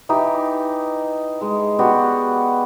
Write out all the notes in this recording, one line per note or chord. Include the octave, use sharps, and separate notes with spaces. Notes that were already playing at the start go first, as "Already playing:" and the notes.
E3 D#4 G4
G#3
B3 F#4 G4 D5